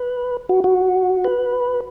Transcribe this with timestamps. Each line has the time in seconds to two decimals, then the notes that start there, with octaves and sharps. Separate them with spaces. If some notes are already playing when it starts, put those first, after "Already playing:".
Already playing: B4
0.49 F#4
0.64 F#4
1.24 B4